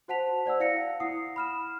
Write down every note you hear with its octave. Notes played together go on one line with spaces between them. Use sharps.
F#4 C5 F#5 A5 B6 F7
C5 D5 F#5 E6
E4 F5 F#5 A#6 C#7
E4 F#5 D#6 C7
B5 F6 E7